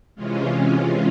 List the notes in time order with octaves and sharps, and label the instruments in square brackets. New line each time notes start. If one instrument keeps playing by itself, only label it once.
[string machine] C3 E3 G#3 C#4 F4